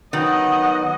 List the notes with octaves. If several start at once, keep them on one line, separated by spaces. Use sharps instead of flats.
D#3 F#3 B3 D#5 F#5